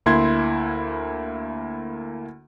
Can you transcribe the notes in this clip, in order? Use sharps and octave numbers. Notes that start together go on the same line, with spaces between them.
D2 A#3 E4 C6 G#6